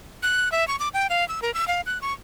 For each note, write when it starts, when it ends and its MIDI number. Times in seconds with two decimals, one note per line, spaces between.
0.23 0.51 90
0.52 0.67 76
0.68 0.78 85
0.80 0.89 86
0.94 1.07 79
1.10 1.27 77
1.28 1.40 88
1.42 1.53 70
1.54 1.67 88
1.68 1.81 77
1.86 2.00 90
2.02 2.13 85